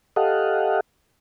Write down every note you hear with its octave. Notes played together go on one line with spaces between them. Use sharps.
G4 A4 D#5 F5 F#5